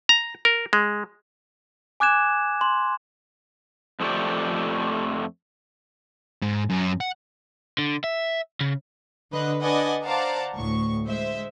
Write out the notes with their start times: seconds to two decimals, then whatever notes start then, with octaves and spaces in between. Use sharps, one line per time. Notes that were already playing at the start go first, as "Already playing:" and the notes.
0.09 A#5
0.45 A#4
0.73 G#3
2.00 G#5 D6 F#6 G#6 E7
2.61 C6
4.00 F2 F3 A3 G4 D5
6.42 G#2
6.70 F#2
7.01 F#5
7.78 D3
8.04 E5
8.61 C#3
9.32 D3 B4 D#5 F#6
9.61 D4 B4 D5 D#5 F#5 G#5
10.04 C5 D5 F5 F#5 A5 A#5
10.56 D2 A2 C#6
11.05 G#3 C5 E5